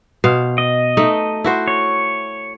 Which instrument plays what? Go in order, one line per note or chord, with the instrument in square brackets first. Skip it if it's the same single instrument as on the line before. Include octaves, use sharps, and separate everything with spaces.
[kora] B2 C5 F5
[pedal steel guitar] D#5
[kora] A3 D#4
E4 F#4 C5
[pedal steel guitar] C#5